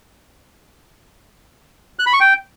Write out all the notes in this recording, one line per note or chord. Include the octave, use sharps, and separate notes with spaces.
F#6
B5
C#6
G5